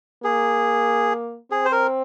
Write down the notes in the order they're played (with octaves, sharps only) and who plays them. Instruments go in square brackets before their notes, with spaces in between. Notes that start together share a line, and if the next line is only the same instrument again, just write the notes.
[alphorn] A#3 [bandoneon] G#4
[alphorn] C4 [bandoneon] G#4
[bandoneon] C5
A#4